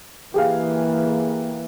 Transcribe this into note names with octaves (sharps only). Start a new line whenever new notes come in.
E3 A#3 G4 G#4 F5